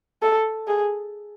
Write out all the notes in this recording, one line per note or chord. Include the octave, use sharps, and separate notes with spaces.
A4
G#4